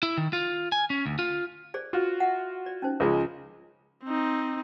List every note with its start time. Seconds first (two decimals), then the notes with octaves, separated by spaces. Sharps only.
0.03 E4
0.17 D#3
0.33 F4
0.72 G#5
0.90 C#4
1.06 D2
1.19 F4
1.74 G#4 C5 D5
1.93 F4 F#4
2.20 E5 F#5
2.66 D5
2.82 C#4 D#4 C5
3.00 C#2 F3 G#3
4.04 C4 D#4